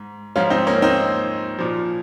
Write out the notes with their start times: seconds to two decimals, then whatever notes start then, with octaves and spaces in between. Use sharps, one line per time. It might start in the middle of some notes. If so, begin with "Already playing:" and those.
Already playing: G#2
0.36 G#2 F3 C#4 F4
0.50 C4 D#4
0.67 A#3 C#4
0.82 C4 D#4
1.59 A#2 F3